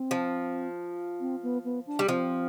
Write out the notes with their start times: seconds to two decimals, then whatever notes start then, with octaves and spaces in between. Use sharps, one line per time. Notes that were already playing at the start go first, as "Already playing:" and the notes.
Already playing: C4
0.11 F3
1.20 C4
1.43 B3
1.64 B3
1.87 D4
1.99 G3
2.08 F3 C4